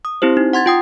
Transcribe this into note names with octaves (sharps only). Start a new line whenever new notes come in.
D#6
C4 E4 G4 C5
D#4
F#5 C6 G#6 A6
F4 G5 D#6